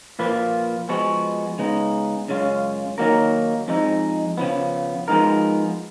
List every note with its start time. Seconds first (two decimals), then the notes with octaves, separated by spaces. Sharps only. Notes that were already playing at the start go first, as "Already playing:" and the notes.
0.19 A#2 F3 A#3 F4 B4
0.89 F3 G#3 B3 F#4
1.58 C#3 G#3 B3 D#4
2.28 F#2 C#3 G#3 C#4 F4
2.98 D#3 F#3 A#3 D#4 A#4
3.68 F2 F3 G#3 D#4
4.37 C#3 F3 B3
5.08 F3 G#3 B3 D#4 A#4